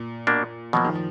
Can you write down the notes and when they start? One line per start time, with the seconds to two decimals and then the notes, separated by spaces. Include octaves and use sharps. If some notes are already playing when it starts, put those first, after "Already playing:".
Already playing: A#2
0.27 B2 A#3 D4
0.73 B2 F3 F#3 A#3
0.84 D#3
0.95 F3